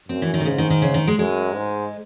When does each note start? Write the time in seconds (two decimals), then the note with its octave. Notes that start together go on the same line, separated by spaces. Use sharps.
0.09 F#2 C4
0.22 E3
0.34 D#3
0.40 C3
0.45 G#2 C#3
0.58 D#3
0.70 D#3
0.82 C#3
0.94 D#3
1.07 G#3
1.19 F#2 G#3
1.55 G#2